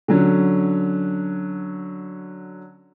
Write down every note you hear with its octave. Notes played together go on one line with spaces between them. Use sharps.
D3 F#3 C#4